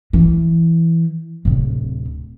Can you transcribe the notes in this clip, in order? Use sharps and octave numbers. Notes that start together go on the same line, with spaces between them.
E3
D1 C3